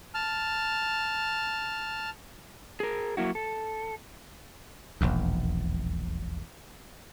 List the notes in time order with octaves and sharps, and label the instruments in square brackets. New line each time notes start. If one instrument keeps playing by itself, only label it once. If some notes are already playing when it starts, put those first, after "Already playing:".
[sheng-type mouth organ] A5 F6
[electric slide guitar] G#4 A#4
F#3 A#3 E4 F#4
A4
[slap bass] E1 A#1 D#2